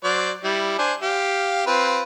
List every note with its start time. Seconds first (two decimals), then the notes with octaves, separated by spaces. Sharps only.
0.04 F#3 C5 D5
0.44 G3 E4
0.79 D4 C5 G#5
1.03 G4 F5
1.67 C4 F4 B4